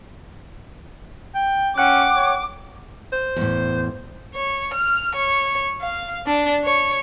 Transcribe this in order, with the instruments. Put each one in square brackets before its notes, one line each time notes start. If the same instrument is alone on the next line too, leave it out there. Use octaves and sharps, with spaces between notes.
[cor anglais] G5
[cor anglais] C#4 [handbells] F#5 G5 F#6 [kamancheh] D6
[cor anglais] C#5
[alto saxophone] C5
[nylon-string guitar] E2 A2
[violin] C#5
F6
C#5
F5
D4
C#5